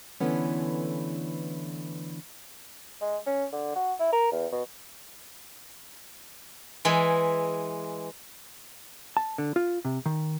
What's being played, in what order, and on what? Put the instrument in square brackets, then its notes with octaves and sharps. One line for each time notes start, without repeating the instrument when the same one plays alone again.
[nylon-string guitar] D3 E3 A3 B3 C#4
[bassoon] G#3
C#4
D3
F#4
E4
A#4
E2
B2
[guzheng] E3 G#3 E4 B5
[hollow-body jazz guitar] A5
D3
F4
C3
D#3